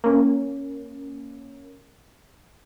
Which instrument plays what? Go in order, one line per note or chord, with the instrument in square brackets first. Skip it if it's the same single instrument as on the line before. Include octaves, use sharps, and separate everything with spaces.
[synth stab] A#3 C#4